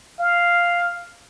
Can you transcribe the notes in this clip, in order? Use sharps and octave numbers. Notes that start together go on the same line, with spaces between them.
F5